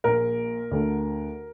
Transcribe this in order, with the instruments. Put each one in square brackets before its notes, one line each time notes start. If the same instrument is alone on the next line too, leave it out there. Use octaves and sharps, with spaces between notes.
[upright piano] A#1 A#2 A#4
D2 D3